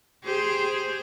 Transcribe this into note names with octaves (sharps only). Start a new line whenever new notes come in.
G4 G#4 C5